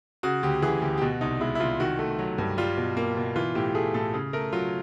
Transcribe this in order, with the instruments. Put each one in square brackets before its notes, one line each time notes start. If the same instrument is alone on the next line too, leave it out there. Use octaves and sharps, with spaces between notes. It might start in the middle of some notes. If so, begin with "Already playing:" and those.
[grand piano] C#3 F#4
D2 G4
E3 G#4
D2 G4
G4
B2 F#4
C2 D#4
G#3 E4
E4
C2 F4
D#3 F#4
A3
F#3
G2
G3 F4
B2
A#3
B2
E3 F4
A2 G4
A3 G#4
A2 A4
C#3
A3 A#4
F#3 F4